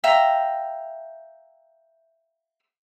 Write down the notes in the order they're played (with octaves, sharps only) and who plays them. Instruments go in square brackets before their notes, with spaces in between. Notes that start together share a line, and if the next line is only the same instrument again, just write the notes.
[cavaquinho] E5 F5 G5 A#5